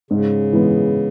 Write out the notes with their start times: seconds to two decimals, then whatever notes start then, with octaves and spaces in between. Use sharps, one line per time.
0.11 G#2 C#3
0.52 E3 G#3 B3